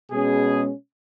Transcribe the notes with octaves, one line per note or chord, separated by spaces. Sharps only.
B2 G#3 C#4 G#4